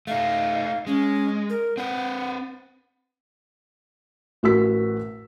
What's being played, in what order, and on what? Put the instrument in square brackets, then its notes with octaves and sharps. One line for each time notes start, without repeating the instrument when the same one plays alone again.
[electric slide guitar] A3 D#4 [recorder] F5
[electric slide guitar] G#3 [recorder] C#4
[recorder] A#4
[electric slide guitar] C4 B4 [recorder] F#5
[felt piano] A1 F#4 A#4 E6 B6